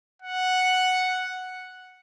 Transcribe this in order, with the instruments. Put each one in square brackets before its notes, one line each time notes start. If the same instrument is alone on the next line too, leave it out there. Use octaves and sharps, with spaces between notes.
[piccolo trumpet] F#5